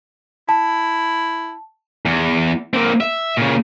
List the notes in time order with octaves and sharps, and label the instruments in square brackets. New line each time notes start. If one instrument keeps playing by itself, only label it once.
[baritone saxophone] E4 [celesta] A5
[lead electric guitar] E2
A#3 C4
E5
A#2 C#3